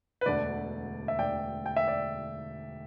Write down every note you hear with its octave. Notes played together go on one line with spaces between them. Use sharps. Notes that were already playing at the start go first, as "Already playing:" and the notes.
B4
E1 D2 D3 D5
E5
E1 D2 D3 D5 G5
G5
E5
D5